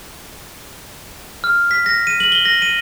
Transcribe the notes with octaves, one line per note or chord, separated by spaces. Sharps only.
F6
B6
A#6
D#7
F#7
G7
A#6
D#7